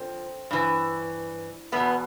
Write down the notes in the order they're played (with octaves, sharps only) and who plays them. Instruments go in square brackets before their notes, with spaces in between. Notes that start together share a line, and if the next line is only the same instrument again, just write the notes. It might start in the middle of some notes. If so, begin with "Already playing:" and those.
Already playing: [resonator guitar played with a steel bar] D3 F3 C4
G2 E3
E2 B2 B3